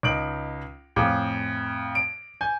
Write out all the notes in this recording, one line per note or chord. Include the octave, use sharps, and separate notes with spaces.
C#2 D#4 D7 F#7
F2 A2 G#4 F5 D6
D7
G#5 G6